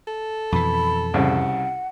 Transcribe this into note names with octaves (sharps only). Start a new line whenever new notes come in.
A4
F2 B2 E3 B5
C2 C#3 F#5